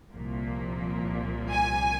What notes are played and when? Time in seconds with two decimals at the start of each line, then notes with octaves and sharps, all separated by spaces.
0.13 C2 A#2 F3 A#3
1.51 G#5